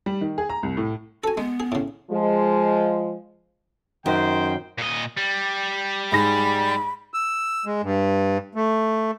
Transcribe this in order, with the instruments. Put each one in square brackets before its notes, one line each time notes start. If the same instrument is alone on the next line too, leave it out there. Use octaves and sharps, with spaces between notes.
[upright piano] G3
D#3
G#4
A#5
C2
A2
[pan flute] F#4 [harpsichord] A4 G#5
[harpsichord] G#3 [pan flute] B3
[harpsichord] G#4
A2 C#3
[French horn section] F3 G#3
[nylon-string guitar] F#2 [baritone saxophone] D#3 [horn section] C5 G5
[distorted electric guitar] A#2 D#5
G3
[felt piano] G#2 G#4 A#6 [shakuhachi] B5
[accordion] E6
G#3
G2
A3